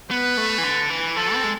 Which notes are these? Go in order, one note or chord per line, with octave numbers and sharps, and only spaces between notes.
B3 B4
A3
E3
D3
E3
F3 A4
C4
G#3